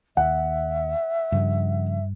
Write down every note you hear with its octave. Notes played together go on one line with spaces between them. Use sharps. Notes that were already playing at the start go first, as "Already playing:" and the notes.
D#2 E5 F#5
G2 C#3 F3